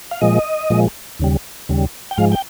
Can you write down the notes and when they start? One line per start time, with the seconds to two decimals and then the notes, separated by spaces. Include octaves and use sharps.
0.11 F5
0.21 A#2 F3 G#3 D#5
0.70 A#2 F3 G#3
1.20 D#2 C#3 G3
1.69 D#2 C#3 G3
2.11 G5
2.18 G#2 F3 G#3 F5
2.32 G5